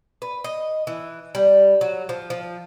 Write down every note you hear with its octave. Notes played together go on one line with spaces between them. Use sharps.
B4
D#5
E3
G3
F#3
F3
F3